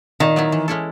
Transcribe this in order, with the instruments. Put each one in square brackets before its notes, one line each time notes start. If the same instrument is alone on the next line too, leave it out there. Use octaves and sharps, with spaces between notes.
[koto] A#2 [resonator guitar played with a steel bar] D#3
[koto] F#3 B3 E4
E3
G#3 C#4 E4 A4